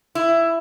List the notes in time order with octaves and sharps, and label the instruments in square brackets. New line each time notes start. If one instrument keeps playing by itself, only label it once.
[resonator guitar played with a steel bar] E4